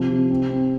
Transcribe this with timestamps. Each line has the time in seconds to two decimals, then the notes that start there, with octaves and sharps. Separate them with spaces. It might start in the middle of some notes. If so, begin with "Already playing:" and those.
Already playing: C3 F3
0.10 C3
0.30 C4
0.50 C4